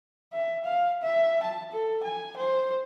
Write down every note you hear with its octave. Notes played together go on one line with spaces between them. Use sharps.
E5
F5
E5
A5
A4
G#5
C5